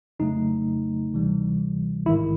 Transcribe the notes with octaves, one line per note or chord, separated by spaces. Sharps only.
F2 C#3 F#3 A3 D#4
D2 C3 E3 G3
A1 G#2 D#3 E4